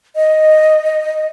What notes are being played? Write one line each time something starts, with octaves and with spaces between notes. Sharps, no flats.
D#5